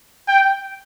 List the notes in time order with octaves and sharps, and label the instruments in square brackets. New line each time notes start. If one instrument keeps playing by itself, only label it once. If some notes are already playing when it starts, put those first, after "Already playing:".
[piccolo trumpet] G5